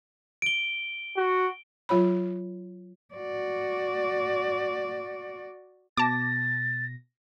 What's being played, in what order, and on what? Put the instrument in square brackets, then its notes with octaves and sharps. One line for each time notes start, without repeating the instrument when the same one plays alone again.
[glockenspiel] D7 G7
[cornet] F#4
[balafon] F#3 F4 C#5 B5
[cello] F#4 D5
[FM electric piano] B2 A#6 [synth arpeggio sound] A5 D6 [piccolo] A6